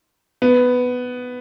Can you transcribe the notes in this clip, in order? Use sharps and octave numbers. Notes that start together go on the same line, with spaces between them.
B3